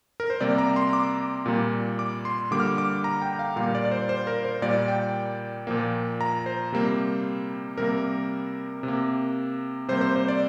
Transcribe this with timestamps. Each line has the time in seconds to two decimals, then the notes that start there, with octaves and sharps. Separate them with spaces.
0.20 A#4
0.30 C5
0.40 C3 G3 A#3 D5
0.58 A#5
0.76 C6
0.93 D6
1.46 A#2 G3 A#3
1.99 D6
2.25 C6
2.51 D3 G3 A#3 D6
2.60 F6
2.67 D6
2.78 D6
3.04 A#5
3.22 G5
3.39 F5
3.56 A#2 G3 A#3 F5
3.75 D5
3.85 D5
3.91 C5
4.09 C5
4.27 A#4
4.45 C5
4.62 A#2 G3 A#3 D5
4.88 G5
5.67 A#2 F3 A#3
6.21 A#5
6.46 C5
6.72 C3 G3 A#3
7.78 C3 G3 A#3 A#4
8.83 C3
8.88 A#3
9.88 C3 G3 A#3 C5
10.01 C5
10.16 C5
10.28 D5